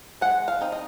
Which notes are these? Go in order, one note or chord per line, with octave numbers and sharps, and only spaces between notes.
G#3 F#5
F5
C4 D#4
D#5